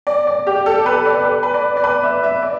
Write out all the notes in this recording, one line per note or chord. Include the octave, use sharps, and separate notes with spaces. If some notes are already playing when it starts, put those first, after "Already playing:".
D5
D5
G4
A4
B4
D5
B4
B4
D5
D5
B4
E5
E5
D5